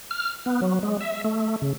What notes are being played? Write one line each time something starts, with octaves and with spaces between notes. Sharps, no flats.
F6
B3
F#3
G#3
E5
A3
C#3